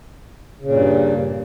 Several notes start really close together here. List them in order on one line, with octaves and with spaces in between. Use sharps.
C#3 A#2 G2